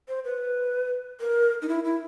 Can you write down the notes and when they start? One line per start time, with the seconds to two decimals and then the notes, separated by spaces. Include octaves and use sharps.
0.09 C5
0.25 B4
1.21 A#4
1.62 D#4
1.69 E4
1.84 E4